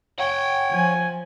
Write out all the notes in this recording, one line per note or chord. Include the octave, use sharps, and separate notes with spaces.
C#5 F#5 G5
F3 G#5